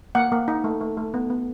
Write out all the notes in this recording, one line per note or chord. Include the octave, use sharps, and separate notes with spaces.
A#3 F#5
A#3
D#4
A3
A3
A3
B3
B3